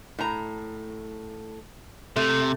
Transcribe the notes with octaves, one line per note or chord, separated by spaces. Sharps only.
A2 A#5
C3 A3